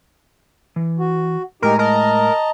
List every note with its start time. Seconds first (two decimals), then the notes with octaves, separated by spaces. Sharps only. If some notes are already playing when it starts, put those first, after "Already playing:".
0.76 E3
0.99 F#4
1.62 A2 G#3 D#4 G4 A#4 G#5
1.79 A#4 D#5 A5 A#5